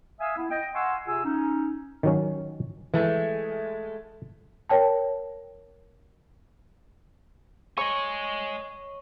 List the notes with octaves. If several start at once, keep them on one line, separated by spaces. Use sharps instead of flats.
E5 F5 G#5 D#6 E6
B3 E4
D#5 G5
F5 F#5 G#5 C6 C#6 E6
C3 F4 G#4 G#5 E6
C#4 D#4
D#3 F#3 C#4
E3 G#3 A3
A#4 C#5 G5 A5
C#5 D#5 G#5 C#6